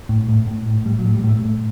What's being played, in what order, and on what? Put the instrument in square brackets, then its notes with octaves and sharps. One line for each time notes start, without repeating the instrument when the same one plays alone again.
[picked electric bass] A2
A2
A2
A2
A2 G3
F#3
A2
G3
A2 A3
A2